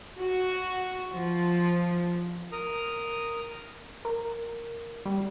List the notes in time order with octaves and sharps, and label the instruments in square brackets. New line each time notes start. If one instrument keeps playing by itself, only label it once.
[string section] F#4
F3
[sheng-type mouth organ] A#4 A#5 D#6
[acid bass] A#4
G3